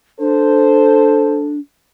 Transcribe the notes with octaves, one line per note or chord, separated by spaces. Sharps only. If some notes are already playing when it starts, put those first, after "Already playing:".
D4 A4 C5